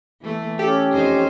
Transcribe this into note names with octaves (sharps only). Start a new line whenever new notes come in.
E3 A3
C#4 G4 A4
F2 D#4 C5